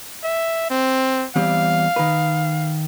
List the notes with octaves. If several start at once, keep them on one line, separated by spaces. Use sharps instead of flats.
E5
C4
E2 G3 C4 F5
D#3 B4